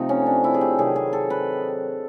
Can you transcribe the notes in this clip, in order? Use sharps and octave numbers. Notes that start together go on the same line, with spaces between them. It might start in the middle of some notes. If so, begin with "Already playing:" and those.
Already playing: C3 F3 A3 D#4
C#4
D4
E4
G#4
G4
C3 D#3 F#3 G#4
G#4
A4
B4